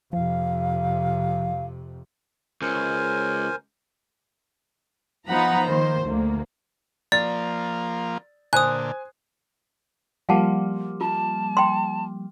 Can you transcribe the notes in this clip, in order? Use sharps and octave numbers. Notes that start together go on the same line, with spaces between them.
F2 C3 F3 F5
C#2 A#4 C5 G#5
F3 B3 D#4 F#5 A#5 B5
D#3 A#3 C5
D2 A#3
F3 A#3 D5 A6
A#2 D3 C5 G#5 D#6 F#6
F3 G3 A#3 F5 F#5 A5
F4 A5
G5 C6